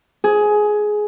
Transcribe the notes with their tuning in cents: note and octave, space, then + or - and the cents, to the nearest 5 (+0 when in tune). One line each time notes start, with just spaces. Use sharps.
G#4 +15